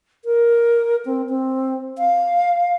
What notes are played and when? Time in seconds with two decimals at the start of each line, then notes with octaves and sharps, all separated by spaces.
0.25 A#4
1.05 C4
1.29 C4
1.98 F5